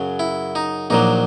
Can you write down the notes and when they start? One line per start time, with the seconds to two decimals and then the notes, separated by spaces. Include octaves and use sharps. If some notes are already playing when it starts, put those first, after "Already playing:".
Already playing: F#2 C#3 F#3
0.19 E4
0.55 D#4
0.90 A#1 A#2 F#3 D#4